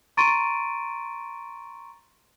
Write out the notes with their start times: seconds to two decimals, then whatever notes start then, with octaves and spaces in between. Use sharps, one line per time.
0.17 A#5 C6 C#6 A6 D7 D#7